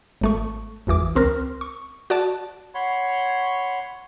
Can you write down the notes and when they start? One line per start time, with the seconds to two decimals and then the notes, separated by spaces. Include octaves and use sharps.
0.21 G#1 A3 C#6
0.87 G#1 E2 E3 D6
1.15 C#2 C4 A#4 F6
1.61 C#6
2.10 F#4 D5 A5
2.75 C#5 F#5 B5 C6